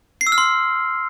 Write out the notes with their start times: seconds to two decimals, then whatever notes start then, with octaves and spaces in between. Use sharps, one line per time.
0.21 C7
0.27 E6
0.32 F6
0.38 C6